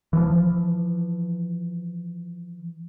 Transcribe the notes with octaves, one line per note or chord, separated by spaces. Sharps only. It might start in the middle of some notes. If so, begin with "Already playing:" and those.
E3 F3